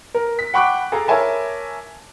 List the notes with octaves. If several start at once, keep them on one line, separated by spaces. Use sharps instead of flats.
A#4
B6
F#5 G5 B5 C#6 D6 F#6
G#4 A4 F5 A#5
A#4 C#5 E5 G#5 A5 B5